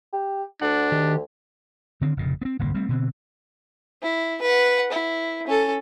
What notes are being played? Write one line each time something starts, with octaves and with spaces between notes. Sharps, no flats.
G4
D2 D4 F#5
D#3 G4 D#5
D3 D#3 C4
F1 A#2 C#3
B3 C4
D1 G1 C2 A#3
G3 A3 C4
B2 D3 C4
E4
B4 F#5
E4
C#4 A4